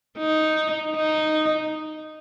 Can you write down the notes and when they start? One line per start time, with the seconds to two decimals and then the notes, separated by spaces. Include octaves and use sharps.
0.18 D#4
0.96 D#4